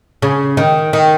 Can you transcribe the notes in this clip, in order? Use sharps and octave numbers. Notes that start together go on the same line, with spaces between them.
C#3
D#3
D#3